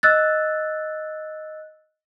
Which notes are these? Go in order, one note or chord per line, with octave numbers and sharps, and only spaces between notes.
D#5 E6 F#6 A6